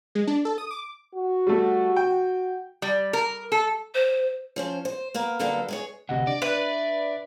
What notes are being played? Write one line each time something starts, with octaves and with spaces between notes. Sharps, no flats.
G#3
D4
A4
D#6
D6
F#4
G3 A3
G5
G3
A#4
A4
C5
F3 C#4 C5
C5
A#3 B3 A#4
D3 F#3 G3 A#3 B3 A4
G#3 G#4 C#5
A1 D2 C3 D#5 F#5
D4 D5
B4 E5